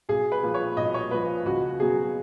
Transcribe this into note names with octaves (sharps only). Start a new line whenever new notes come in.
B1 G#4
B4
A#2 F3
C#5
B1 D#5
C#5
A#2 F3 B4
C#2 F#4
B2 F#3 G#4